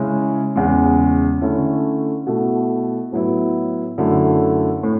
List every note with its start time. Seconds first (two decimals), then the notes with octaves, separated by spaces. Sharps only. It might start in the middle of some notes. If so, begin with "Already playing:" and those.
Already playing: C#3 G#3 C#4 E4
0.56 E2 C#3 G#3
1.41 D3 A3 C#4 E4
2.26 B2 A3 E4
3.12 A2 F#3 B3 E4
3.98 F#2 D3 A3 E4
4.83 A2